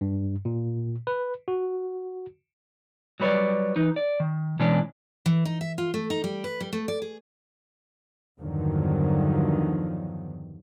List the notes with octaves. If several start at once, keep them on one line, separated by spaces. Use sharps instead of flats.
G2
A#2
B4
F#4
F#3 G3 B4 C#5 D5
E3 D#4 B4
D5
D#3
B2 E3 G#3 C#4 D4
E3
D#4
E5
F4
A3
D#4
G3
B4
G3
A3
D5
G#4
E2 G2 D3 D#3 F3 F#3